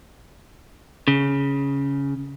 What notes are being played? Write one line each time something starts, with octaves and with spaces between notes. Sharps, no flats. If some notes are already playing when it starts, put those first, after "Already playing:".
C#3